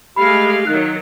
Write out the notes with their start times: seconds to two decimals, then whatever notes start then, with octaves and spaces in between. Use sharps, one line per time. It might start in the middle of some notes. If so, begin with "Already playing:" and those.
0.16 G#3 A3 G4 F5 B5
0.67 D#3 F#3 D#4 F#6